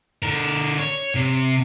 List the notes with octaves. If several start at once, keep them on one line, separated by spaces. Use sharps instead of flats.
D3 A#4
C#5
C3